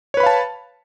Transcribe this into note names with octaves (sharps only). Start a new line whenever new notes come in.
B4 C#5 F5 A5 B5